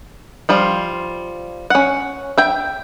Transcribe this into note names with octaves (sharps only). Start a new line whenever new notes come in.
F3 G3 F4
C#4 F#5
E5 G5